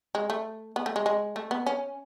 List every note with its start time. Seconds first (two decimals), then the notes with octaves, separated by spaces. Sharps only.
0.15 G#3
0.30 A3
0.76 B3
0.86 A3
0.96 G#3
1.06 G#3
1.36 A3
1.51 B3
1.66 C#4